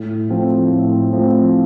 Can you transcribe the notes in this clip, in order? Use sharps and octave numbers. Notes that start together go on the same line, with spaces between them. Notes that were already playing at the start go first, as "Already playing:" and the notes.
Already playing: A2
F3 A3 C4
A2
F3 A3 C4